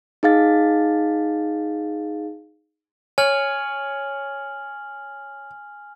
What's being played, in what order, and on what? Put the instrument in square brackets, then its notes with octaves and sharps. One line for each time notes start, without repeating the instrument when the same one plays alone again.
[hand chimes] D#4 G#4 F5 A6
[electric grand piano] C#5 [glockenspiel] G#5 F6 F#7